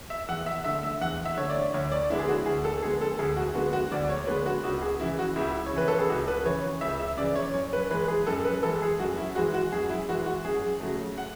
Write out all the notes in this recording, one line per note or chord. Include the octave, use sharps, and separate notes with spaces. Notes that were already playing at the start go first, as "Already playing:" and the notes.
E5
E2 F#5
E5
D3 A3 E5
E5
E2 F#5
E5
D3 A3 C#5
D5
D2 C#5
D5
D3 G#3 B3 E4
G#4
F#4
D2 G#4
A4
D3 G#3 B3 G#4
A4
D2 G#4
F#4
D3 G#3 B3 F#4
F#4
D2 D5
C#5
D3 G#3 B3 B4
F#4
C#2 F#4
G#4
C#3 E3 E4
F#4
C#2 E4
C#5
C#3 E3 B4
A4
G#4
C#2 F#4
B4
C#3 E3 C#5
C#2 E5
E5
C#3 E3 D5
C#5
F#2 C#5
B4
E3 G#3 B4
G#4
F#2 A4
B4
E3 G#3 A4
G#4
F#2 F#4
E4
E3 G#3 F#4
F#4
F#2 G#4
E4
E3 G#3 F#4
F#4
F#2 G#4
C#3 F#3 A3
F#5